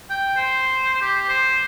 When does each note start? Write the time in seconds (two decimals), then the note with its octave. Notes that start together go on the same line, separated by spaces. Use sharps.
0.10 G5
0.36 C5
1.02 G4
1.29 C5